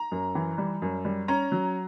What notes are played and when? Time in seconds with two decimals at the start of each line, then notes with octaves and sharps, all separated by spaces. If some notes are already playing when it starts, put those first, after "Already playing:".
Already playing: A#5
0.12 F#2
0.35 E3
0.58 G3
0.82 F#2
1.05 G3
1.28 C#4 A#5
1.52 F#3